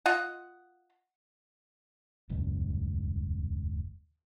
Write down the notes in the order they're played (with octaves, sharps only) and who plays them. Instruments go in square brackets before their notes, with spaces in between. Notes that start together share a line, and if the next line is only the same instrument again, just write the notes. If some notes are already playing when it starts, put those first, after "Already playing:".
[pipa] F4 D#5 F#5
[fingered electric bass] D#1 C#2 F#2